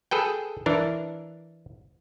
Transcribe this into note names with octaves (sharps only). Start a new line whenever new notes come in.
G#4 A4 B4 G5
E3 D4 A#4